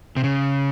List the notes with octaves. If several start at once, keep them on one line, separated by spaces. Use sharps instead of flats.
C3
C#3